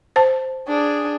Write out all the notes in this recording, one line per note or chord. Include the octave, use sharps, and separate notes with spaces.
C5 A5
D4 G#4